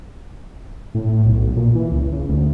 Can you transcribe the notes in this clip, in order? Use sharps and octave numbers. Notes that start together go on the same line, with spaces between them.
A2
B1
A#2
E3
C#2
C#3
D2